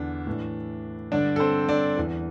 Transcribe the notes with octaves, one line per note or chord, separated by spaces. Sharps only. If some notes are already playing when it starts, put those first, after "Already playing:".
Already playing: E2 D3 D4
A2 E3
G2 D3 D4 D5
A4
C4 C5
D4 D5
E2 E3